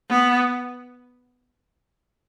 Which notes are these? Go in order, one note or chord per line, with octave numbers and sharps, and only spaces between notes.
B3